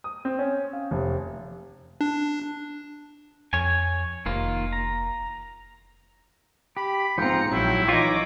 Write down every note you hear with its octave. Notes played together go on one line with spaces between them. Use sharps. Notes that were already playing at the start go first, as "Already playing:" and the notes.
D#6
C4
C#4
F5
F1
D4
F2 C#5 G#5
F1 D#3 A#3 F4
A#5
G4 B5
G#2 F3 C4 F4 G5 A#5 C#7
A#1 F#3 E4 G5
E3 D#4 F4 C#5 D6 A#6